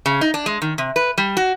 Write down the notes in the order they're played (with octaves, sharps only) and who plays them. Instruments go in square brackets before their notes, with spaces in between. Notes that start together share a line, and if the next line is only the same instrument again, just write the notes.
[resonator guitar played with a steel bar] C#3
D#4
D4
G#3
D#3
C3
B4
G3
F#4